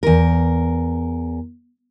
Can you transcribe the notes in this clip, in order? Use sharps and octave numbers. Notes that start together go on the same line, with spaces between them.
E2 A#4